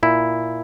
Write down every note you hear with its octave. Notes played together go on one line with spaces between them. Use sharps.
A#2 E4